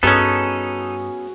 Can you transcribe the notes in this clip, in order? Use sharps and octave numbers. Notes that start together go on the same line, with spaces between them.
G2 B3 C#4 D#4 F#4 G#4 A4